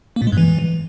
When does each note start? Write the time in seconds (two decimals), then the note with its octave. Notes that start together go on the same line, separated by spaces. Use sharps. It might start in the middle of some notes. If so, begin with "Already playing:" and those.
0.16 A#3
0.22 A#2
0.27 G#3
0.32 G2
0.38 E3